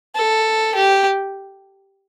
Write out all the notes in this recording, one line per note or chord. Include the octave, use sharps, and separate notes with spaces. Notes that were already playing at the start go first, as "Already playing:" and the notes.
A4
G4